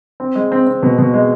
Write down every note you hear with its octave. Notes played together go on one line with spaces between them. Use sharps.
C4
G#3
C4
C4
B2
B2
G#3